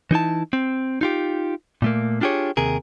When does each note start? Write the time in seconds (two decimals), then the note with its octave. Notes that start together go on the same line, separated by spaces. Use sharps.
0.11 E3 D#4 E4 A5
0.53 C4
1.01 D#4 F4 G4
1.82 A#2 A3 A#3
2.21 D4 F4 G4 G#4 C#5
2.57 D#2 C3 G#4 A#4